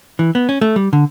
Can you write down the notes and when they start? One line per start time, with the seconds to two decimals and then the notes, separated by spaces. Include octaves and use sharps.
0.19 E3
0.35 B3
0.49 C#4
0.61 A3
0.76 G3
0.93 D3